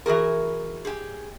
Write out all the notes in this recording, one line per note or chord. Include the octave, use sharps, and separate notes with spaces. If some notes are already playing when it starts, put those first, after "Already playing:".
E3 F#4 G#4 A#4
G4 G#4